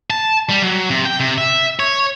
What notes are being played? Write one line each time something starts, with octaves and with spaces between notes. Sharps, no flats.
A5
G3
F#3
C3
G5
C3
E5
C#5